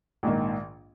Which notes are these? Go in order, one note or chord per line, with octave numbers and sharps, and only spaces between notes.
A#1 G#2 D#3 A#3